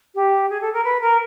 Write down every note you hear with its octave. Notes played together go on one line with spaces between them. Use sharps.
G4
G#4
A4
A#4
B4
A#4